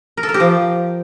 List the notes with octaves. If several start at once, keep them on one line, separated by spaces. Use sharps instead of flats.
A#4
A4
A#4
G4
F3